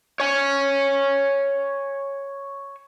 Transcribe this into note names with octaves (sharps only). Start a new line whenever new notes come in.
C#5 G#5